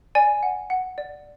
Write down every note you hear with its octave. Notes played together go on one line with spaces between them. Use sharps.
D5 G#5
F#5
F#5
D5